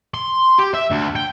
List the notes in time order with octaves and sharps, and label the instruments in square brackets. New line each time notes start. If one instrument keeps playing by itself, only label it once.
[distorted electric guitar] C6
G4
E5
D2
G5